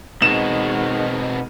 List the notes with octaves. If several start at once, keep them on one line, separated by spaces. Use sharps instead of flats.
B2 D#3 G#3 C4 D#4 E7